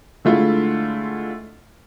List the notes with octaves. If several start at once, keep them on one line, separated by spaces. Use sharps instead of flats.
D3 G#3 A3 E4 F4